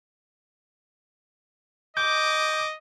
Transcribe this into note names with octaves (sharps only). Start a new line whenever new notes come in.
D#5 D6 G6